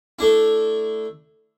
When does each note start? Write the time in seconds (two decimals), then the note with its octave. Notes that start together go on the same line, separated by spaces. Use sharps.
0.19 A3 D4 E4